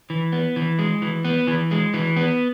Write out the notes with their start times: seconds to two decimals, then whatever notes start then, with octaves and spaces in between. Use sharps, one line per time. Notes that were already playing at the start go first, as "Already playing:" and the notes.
0.10 E3
0.32 B3
0.56 E3
0.79 G#3
1.02 E3
1.24 B3
1.47 E3
1.71 G#3
1.94 E3
2.16 B3